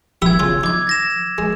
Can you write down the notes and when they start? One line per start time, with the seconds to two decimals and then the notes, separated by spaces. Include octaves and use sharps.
0.22 E4 G4 E5 E6 G#6
0.39 C#3 F4
0.64 D#4 D6 G#6
0.87 A6 A#6 E7
1.38 G#3